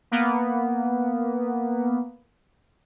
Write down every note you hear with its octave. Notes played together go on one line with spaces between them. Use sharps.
A#3 B3